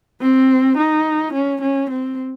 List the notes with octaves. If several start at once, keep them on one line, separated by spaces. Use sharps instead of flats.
C4
D#4
C#4
C#4
C4